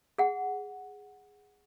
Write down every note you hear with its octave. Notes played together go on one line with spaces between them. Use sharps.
G#4 F#5